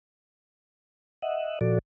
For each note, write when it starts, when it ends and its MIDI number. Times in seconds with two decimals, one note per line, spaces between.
1.22 1.59 75
1.22 1.59 76
1.22 1.59 78
1.61 1.79 46
1.61 1.79 53
1.61 1.79 66
1.61 1.79 69
1.61 1.79 74